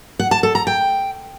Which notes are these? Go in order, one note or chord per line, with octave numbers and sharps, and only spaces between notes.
F#5
A5
A4
A#5
G5